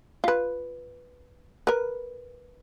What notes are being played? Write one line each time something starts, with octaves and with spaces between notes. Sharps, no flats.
F4 B4
A#4 B4